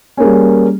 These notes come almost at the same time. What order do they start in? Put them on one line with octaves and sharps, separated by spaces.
C#4 A#3 G#4 G3